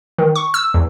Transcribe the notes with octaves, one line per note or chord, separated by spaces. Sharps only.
D#3
C#6
E6
E2